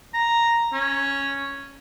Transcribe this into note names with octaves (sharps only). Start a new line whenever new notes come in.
A#5
C#4